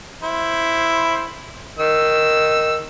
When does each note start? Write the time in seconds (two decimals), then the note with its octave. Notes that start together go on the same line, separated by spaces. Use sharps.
0.22 E4 C5
1.79 D#3 E6